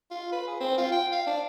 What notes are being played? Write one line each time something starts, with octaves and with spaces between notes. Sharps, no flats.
F4
B4
G#4
C4
F4
G5
F5
D4